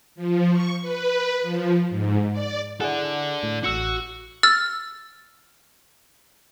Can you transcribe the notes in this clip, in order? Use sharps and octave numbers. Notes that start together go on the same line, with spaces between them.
F3
C#6
B4
F3
G#2
D5
E4 G#4 A4 D5 F#5
A2
A1 F#4 E6 C#7
E6 F6 A6